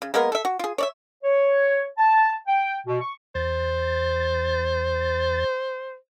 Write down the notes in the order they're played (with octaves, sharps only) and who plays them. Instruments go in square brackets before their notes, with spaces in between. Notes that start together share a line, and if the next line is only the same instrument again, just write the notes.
[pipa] C#3
G#3 A#3 B3 A#4
A4 E5
F#4
F4 G#4
C#5 D5 E5
[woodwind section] C#5
A5
G5
B2
C#6
[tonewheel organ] E2 A6 [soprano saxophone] C5